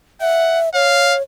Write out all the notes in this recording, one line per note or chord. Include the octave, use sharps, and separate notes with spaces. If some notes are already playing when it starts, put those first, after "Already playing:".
E5 F#5
C#5 F5